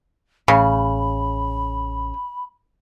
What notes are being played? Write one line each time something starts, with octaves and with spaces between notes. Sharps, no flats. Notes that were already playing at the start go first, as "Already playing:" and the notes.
A1 C#3 B5